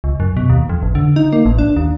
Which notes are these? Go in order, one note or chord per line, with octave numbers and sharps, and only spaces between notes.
C#2
F#2
B2
D#2
F2
A1
D3
D#4
A#3
A1
D4
D#2